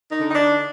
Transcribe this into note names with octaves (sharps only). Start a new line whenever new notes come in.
D#4
D3
D#4
D4